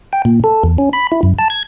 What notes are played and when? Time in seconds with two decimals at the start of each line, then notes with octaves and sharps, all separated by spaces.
0.13 G5
0.25 A#2
0.44 A4
0.64 E2
0.78 C#4
0.93 B5
1.12 E4
1.23 F#2
1.39 A5
1.50 G#6